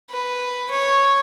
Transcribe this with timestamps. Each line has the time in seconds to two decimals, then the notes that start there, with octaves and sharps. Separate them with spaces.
0.11 B4
0.70 C#5